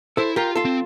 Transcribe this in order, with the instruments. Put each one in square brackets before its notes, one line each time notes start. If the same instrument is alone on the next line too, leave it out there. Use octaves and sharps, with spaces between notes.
[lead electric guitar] E4 [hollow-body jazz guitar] A4 C5
[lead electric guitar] F4 [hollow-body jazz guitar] G4 A#4
[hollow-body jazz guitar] F4 A4
[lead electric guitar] C4